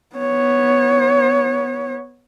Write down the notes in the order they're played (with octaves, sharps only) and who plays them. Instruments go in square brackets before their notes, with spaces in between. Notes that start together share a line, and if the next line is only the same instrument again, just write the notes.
[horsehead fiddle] B3 C#5